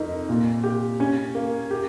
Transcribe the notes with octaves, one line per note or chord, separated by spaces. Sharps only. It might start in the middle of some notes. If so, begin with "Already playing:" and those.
Already playing: F2 D#4 A#4
A#2
G4
C#4
A#3
G4